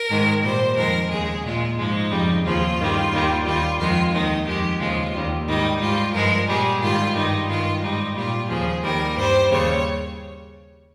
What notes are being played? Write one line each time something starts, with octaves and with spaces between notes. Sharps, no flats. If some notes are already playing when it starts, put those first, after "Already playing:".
Already playing: A#4
G#2 D#3 G#3
A#2 G3 C5
F2 D#3 G#3 A#4
D#2 C#3 G#3 G#4
A#2 G#3 F4
G#2 F3 G#3 D#4
F2 C#3 G3
D#2 C#3 F3 F4
G2 D#3 G3
D#2 D#3 G3
D#2 D#3 G3 F4
F2 D#3 G#3 F4
D#2 D#3 G#3 D#4
F2 D#3 G#3 G4
D#2 C#3 F3 G#3 F4
D#2 D#3 G3
G#2 D#3 G3 D#4
G#2 G3 F4
G2 F3 G#3 A#4
A#2 G3 G#4
G#2 D#3 G3 F4
G2 D#3 G3 D#4
G2 D#3 G#3 F4
G#2 G3 D#4
A#2 G3 F4
D#2 C#3 F3 G#4
D#2 D#3 G3 A#4
G2 G3 C5
D#2 C#3 G3 C#5